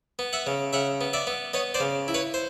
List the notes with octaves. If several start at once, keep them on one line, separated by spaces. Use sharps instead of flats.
B3
E5 F#5
C#3
C#3 E5 F#5
B3
D5 E5
B3
B3 C#5 D#5
C5 D5
C#3
E4
B4 C#5
C5